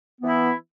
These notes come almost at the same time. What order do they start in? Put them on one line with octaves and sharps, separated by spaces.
B3 E3 E4